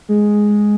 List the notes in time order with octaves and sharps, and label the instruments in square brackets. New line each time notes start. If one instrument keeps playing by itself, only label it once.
[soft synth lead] G#3